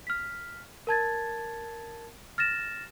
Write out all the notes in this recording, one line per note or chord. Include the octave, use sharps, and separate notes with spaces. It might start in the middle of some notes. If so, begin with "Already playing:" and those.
F6 B6
A#4 A5 G#6 A6
F6 A6 A#6 E7